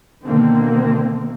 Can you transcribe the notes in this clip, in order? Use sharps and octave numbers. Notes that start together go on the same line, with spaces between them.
B2 D3 D#3 A#3 C4